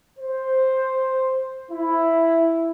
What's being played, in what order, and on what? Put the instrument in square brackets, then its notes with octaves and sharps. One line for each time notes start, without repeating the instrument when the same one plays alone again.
[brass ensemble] C5
E4